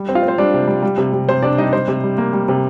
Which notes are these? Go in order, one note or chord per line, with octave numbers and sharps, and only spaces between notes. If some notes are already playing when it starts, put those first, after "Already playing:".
Already playing: G3
C4
F4 F5
C4
C5
G3 D4 D5
C3
G3
G3
C3
C3
C3 C5
C3 D4 D5
G3 D#4 D#5
G3 C5
C3
G3
A#3
G3
C3